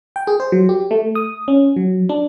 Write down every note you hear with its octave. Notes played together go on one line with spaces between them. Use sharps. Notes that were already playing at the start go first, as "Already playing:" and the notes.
G5
G#4
C5
F#3
G4
A3
D#6
C#4
F#3
D4